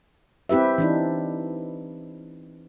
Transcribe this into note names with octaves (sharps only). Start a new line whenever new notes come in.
C4 E4 G4 B4 E5
E3 D4 D#4